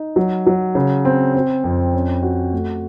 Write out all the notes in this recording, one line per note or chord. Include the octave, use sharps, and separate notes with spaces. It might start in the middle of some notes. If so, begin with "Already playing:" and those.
Already playing: D#4
F#3
F#3
C#3
C4
C4
F2
C#4
F#4
A3